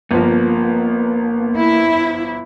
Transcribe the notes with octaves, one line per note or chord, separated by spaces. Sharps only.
G1 F3 A#3 B3
E4